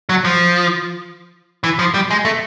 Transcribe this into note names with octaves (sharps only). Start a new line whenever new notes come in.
F#3
F3
E3
F3
G3
G#3
A3